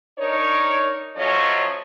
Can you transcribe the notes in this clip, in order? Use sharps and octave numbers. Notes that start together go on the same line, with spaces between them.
D4 D#4 A#4 C#5
F3 F#3 A3 C#4 C#5 D#5